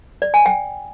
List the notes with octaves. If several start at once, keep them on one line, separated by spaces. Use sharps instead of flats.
D5
G#5
G5